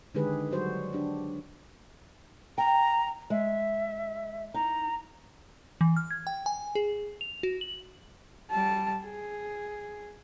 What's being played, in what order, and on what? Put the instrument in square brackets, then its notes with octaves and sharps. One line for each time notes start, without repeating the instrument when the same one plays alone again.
[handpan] D3 D#3 G#3 G4 G#4 B4
F#3 G3 F#4 C5
D4 G4
[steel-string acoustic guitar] G5 [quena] A#5
[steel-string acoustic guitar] G#3 [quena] E5
[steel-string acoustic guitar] D#4 [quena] A#5
[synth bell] E3
F6
G#6
G5
G#5
G#4
F7
F#4
F#7
[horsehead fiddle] G3 A5
G#4